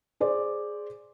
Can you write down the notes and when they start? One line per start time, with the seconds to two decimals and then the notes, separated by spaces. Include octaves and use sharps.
0.20 G#4 C5 D5